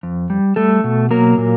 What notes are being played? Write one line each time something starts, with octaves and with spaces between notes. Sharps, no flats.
F2
G3
G3 A3 A4
B2
F#3 A#3 A#4
A#2